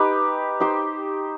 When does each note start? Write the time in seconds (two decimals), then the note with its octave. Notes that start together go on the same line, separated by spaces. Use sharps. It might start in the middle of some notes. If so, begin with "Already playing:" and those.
Already playing: D#4 G4 B4
0.60 D#4 G4 C5